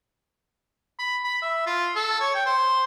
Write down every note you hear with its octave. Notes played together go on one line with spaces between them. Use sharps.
B5
B5
E5
F4
A4
C#5
G5
C5